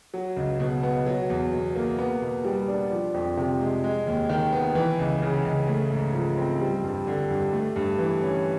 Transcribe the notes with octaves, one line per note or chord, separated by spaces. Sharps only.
F#3
C#2
B2
B3
F#3
E2
B2
A#3
B3
B2
G3
D4
F3
F2
C3
G#3
G#3
D#2
D#3
B3
E3
C#2
C#3
C#2
A3
G#2
F3
C4
G3
G2
D3
G2
A3
G2
E3
C#4